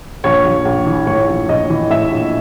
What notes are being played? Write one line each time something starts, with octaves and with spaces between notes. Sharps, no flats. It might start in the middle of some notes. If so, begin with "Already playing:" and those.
A#1 C#5
A#1
A#1
E3
A2 C#5
A#1
A#1 D#5
E3
A2 E5
A#1